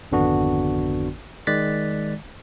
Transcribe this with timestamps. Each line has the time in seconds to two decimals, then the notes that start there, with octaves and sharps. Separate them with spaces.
0.12 G#1 F2 D3 B3 D4 F#4
1.47 D#3 G#3 D5 F#6 A6 B6